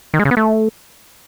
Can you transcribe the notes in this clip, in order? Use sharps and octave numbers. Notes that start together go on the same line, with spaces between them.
D#3
G#3
C#3
B3
A3